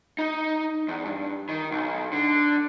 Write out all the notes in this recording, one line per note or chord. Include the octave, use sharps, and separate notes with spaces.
D#4
E2
G2
D#3
B1
D3